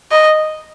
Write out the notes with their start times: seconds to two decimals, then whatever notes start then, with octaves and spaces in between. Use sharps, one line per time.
0.11 D#5